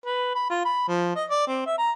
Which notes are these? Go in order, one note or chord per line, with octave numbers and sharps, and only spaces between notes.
B4
B5
F4
B5
F3
D#5
D5
C4
E5
A#5